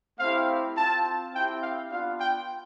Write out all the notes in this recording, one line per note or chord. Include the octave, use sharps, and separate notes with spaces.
A3 C4 E4 G4 F5
C4 F4 A5
C4 E4 G4 G5
F5
B3 D4 F4 F5
G5